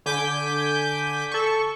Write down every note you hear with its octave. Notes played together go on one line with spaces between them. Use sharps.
D3 G#5 D6 G6 B6
A4 C#6